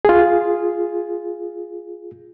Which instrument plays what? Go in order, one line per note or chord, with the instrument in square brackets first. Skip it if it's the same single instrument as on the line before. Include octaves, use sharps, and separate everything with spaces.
[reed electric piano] F4 G#4